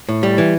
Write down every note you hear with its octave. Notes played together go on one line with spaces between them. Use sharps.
A2
G3
E3